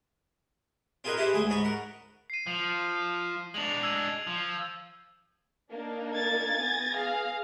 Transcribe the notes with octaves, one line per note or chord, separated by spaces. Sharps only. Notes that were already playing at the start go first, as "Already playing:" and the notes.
C4 F4 G#4 A#4 B4 D#5
D#4 E4 G4 G#4 B4 C5
D2 G#3 G#4
G#2 D#5 B5 C#6
A#4 F#5
C7 D#7
F3
G#3 D4 F7 F#7
E6 G#6 D#7
F3
A#3 D4 D#4
G#6 A6
B3 G#5 A#6
G#4 F5